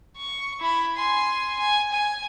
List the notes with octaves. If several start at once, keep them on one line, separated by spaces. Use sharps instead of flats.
C#6
E4 B5
G#5 C6
G#5
G#5